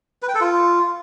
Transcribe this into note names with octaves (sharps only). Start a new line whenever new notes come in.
B4
G5
A4
F4